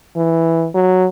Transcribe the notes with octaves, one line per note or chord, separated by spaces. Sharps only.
E3
F#3